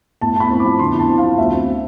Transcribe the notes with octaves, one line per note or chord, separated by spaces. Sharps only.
A2 A5
E4 A5 B5
C4
D6
F3
D3 C6
E4
A5
C4
F5
F3
D2 E5
C4
F3